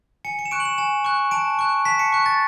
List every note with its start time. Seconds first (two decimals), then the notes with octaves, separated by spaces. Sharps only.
0.25 G#5 C#7
0.39 C#7
0.45 E7
0.51 C#6 F#6 D7
0.60 F#7
0.65 E7
0.78 G#5 E7
1.05 C#6 F#6
1.31 A5 D7
1.59 C#6 F#6
1.85 A5 B6
1.99 C#7
2.12 C#6 F#6
2.26 A6